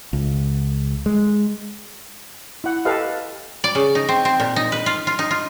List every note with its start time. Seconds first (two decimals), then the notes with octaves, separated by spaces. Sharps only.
0.13 C#2
1.06 G#3
2.64 E4 F#5
2.85 G4 A4 B4 D#5 F5
3.64 D5
3.75 C#3
3.95 D#4
4.09 C4
4.25 C4
4.40 A#2
4.56 D#4
4.72 B4
4.86 F4
5.07 F4
5.19 D#4
5.31 F4